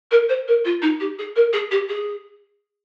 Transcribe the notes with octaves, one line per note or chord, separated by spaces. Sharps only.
A#4
C5
A#4
F4
D#4
G4
G#4
A#4
G#4
G4
G#4